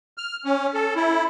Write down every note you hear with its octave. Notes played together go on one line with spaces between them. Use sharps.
F6
C#4
A4
E4